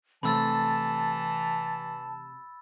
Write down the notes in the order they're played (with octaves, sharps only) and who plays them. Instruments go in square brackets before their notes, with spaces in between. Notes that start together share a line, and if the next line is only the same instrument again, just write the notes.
[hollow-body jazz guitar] C3 A3 [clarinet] E3 [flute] A5 [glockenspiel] B5 E6 A6